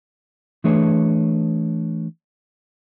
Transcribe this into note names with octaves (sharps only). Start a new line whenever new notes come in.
E3 A3 D4 G#4 B4 C#5